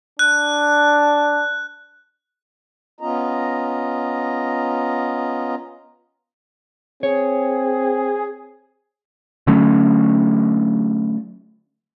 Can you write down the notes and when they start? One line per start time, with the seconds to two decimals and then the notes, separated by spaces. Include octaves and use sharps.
0.19 D4 F#6
3.01 B3 C#4 F4 D#5 A#5
7.03 C4 G#4 C#5
9.47 D3 F#3 A3 C#4